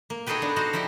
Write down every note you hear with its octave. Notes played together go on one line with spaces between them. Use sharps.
A#3
D#4 F#4 G#4 A4 B4 G5
B3 D4
D#4 F#4 C5 F5
F3 E4 G4 D5 G5